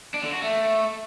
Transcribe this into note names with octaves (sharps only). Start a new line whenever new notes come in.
D4
D3
F#4
A3